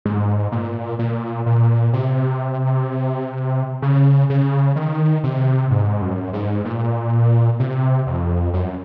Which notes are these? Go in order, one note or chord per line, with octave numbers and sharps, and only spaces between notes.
G#2
A#2
A#2
A#2
C3
C#3
C#3
D#3
C3
G#2
F#2
G#2
A#2
C3
F2
F#2